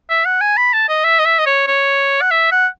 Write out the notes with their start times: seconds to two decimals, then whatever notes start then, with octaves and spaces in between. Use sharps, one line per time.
0.10 E5
0.25 F#5
0.41 G#5
0.57 B5
0.73 A5
0.89 D#5
1.04 E5
1.20 D#5
1.25 E5
1.39 D#5
1.46 C#5
1.68 C#5
2.21 F#5
2.31 E5
2.52 F#5